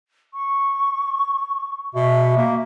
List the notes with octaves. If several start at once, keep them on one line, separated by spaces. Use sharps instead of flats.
C#6
B2 E5
A#3